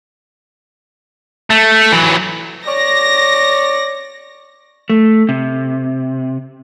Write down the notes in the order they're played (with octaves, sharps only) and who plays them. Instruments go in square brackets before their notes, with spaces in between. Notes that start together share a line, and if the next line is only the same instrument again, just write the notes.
[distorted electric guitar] A3
E3 F#3
[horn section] C#5 D5 [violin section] A#6
[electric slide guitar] A3
C3